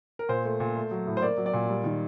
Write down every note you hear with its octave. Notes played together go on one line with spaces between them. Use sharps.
A#4
A#2 C5
A3
A#2
A3
F#3
A2
C5
A#3 D5
F#3
D5
A#2
G3
D#3